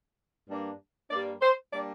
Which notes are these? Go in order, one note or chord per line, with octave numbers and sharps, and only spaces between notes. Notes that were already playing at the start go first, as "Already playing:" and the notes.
G2 G3 A#3 D4
G2 G3 A#3 D4 D5
C5
G3 A#3 D4 D5